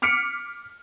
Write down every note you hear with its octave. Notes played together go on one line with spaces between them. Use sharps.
D6 F6 B6 C#7 D7